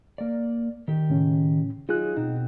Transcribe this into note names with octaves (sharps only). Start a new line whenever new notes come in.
A#3 D5
D#3 G4
A2 C#3 C#4
F#3 D#4 F4 G#4 F#6
B2 C4 D#4